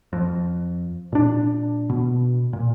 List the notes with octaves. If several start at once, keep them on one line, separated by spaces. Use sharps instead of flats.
F2
A#2 D4
B2
A#2